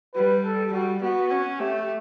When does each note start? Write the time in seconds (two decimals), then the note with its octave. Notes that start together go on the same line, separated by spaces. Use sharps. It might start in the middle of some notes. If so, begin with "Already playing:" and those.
0.15 G3 B4
0.44 A4
0.73 G3 F#4
1.02 B3 F#4
1.31 C#4
1.59 A3 G4